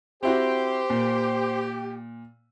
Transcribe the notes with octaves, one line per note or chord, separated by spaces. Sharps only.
C4 E4 F#4 G4 C5
A#2